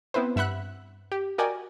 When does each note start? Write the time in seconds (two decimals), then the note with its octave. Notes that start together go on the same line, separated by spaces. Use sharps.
0.14 B3 C4 E4 B4 C5
0.36 G2 E5 F#5 B5 F#6
1.12 G4
1.38 F#4 A#4 D5 D#5 G5 G#5